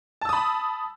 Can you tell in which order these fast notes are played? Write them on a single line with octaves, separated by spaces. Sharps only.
A5 E6 D#6 B5